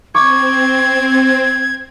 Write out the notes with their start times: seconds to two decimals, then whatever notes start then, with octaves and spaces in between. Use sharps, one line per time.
0.15 C4 C#6 D6 G#6